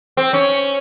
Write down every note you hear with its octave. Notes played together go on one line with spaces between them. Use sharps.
C4
C#4